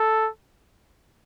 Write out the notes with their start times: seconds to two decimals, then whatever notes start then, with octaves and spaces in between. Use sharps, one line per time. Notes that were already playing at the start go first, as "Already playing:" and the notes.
Already playing: A4